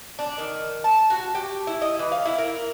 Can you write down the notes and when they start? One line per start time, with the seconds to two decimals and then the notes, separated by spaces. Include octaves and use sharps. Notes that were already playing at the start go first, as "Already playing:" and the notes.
0.19 D4
0.38 D#3
0.84 A5
1.10 F#4
1.35 G4
1.67 E4
1.82 D#5
1.99 E3
2.12 F5
2.25 E4
2.38 A#4